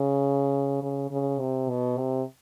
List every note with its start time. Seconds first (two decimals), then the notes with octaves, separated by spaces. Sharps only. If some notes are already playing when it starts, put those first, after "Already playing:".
Already playing: C#3
0.82 C#3
1.11 C#3
1.39 C3
1.69 B2
1.97 C3